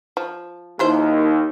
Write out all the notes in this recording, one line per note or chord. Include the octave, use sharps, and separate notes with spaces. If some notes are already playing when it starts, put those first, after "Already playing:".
F3
D#2 F3 E4 C5